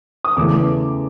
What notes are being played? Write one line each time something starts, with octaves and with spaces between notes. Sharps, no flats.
D#6
E2 C#3 E3 A3 D6